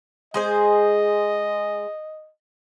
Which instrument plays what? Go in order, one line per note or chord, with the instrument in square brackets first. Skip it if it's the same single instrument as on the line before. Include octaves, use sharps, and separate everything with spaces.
[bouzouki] G#3 G#4 C5 [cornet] D#5